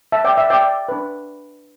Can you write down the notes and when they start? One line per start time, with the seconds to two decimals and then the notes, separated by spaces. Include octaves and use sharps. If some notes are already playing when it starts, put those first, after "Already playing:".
0.12 E5 A5
0.25 D5 G5
0.37 E5
0.50 D5 G5
0.89 D4 B4